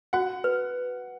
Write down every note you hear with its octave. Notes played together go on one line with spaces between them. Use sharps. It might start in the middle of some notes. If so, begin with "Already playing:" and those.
F#4 F#5
B4